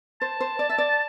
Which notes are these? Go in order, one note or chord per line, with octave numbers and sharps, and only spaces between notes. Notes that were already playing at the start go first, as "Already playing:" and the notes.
C5 A5
C5
D5
E5
D5